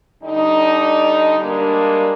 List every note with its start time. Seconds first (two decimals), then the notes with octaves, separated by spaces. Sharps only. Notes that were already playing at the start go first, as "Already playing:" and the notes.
0.23 D3 G3 D4 D#4
1.39 G3 G#3 A#3 D4